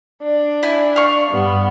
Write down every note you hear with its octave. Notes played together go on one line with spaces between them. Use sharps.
D4
E4 G#5
F5 C#6
G2 B3